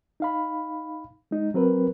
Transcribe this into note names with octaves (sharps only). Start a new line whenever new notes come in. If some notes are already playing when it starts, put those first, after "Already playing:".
D#4 F5 B5
G#3 D#4
F#3 C4 A#4 B4